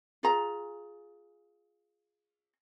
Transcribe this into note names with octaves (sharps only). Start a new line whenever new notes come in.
F4 G#4 A#5